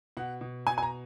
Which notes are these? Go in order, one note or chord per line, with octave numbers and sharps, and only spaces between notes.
B2 F#5
B2
B2 G#5
G#5
A#5